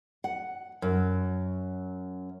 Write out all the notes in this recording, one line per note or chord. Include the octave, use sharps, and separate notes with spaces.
F#5
F#2